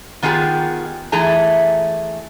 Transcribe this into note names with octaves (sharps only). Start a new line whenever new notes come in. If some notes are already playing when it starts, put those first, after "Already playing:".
D#3 B3 F4 G4 G#4
E3 A3 G#4 A#5